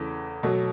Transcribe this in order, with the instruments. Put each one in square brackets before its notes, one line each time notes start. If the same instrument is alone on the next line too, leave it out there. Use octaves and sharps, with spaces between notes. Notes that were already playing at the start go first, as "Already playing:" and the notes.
Already playing: [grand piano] E2 C#3 E3 A3
B2 F#3 A3